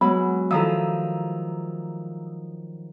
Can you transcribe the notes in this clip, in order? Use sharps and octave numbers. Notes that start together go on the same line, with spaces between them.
F#3 G#3 B3 B5
D#3 F3 E4 A4 F5 A#5 D#6 E6